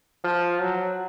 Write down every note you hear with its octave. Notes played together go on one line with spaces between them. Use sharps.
F3
F#3